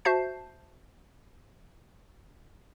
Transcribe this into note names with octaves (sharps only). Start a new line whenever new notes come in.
F#4 C5 E5 A5 G6 C7